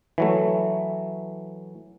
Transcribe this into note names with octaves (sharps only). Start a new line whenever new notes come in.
E3 F#3 A3